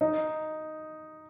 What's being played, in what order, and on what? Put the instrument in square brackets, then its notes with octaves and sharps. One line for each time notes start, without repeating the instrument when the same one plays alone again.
[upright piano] D#4